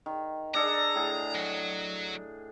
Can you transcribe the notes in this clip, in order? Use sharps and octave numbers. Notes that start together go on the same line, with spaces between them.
D#3
D4 G#4 A4 A#5
A2 G#4
F#3